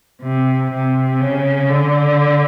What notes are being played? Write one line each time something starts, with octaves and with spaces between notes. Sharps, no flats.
C3
C3
C#3
D3